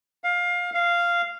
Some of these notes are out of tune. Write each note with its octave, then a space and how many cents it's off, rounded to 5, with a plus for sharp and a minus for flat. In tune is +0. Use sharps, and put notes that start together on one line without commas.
F5 +20
F5 -10